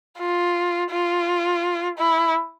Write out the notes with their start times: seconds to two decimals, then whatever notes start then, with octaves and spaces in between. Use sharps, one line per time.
0.18 F4
0.91 F4
1.98 E4